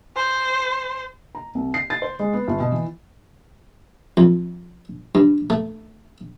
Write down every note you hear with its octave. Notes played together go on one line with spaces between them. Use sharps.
C5
A#5
C2
C7
A6
C5
G#3
B3
G1
B2
E3
F2
G2
A3